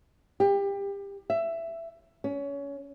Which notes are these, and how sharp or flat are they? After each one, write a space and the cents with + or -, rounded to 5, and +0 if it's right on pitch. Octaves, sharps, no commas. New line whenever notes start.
G4 +25
E5 +15
C#4 +25